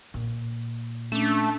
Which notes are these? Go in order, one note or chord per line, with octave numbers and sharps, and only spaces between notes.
A#2
A3 C#4 D4